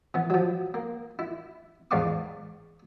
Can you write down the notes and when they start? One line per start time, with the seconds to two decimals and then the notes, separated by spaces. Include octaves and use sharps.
0.14 E3 B3
0.30 F3 F#3
0.74 A#3
1.19 E4
1.91 E2 G#2 D5 F5 C#6 D6